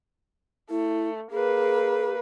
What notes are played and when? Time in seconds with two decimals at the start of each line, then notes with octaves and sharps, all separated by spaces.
0.70 A3 E4
1.32 A#3 G#4 B4